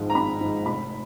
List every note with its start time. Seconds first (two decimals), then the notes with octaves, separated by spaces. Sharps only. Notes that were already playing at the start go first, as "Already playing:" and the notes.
Already playing: G#1 G#2 F3 G#3
0.10 A#5
0.15 G#1 B5
0.40 G#2 F3 G#3
0.66 F1 B5